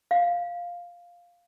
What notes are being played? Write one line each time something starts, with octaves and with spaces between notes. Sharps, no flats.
F5